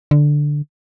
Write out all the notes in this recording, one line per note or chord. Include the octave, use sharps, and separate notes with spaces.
D3